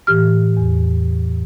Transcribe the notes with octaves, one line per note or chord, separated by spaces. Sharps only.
A2 E3 G4 F6
E2